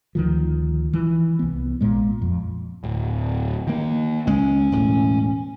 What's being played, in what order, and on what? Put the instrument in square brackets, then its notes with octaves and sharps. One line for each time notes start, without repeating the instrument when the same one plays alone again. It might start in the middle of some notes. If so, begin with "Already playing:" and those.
[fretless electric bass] D2 D#3 F3
E3
C2 B3
A#1 A#2 G#3
F2
[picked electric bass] D1
D#3 A#3
[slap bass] C#2 G#3 [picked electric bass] C#4
[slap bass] E1 A2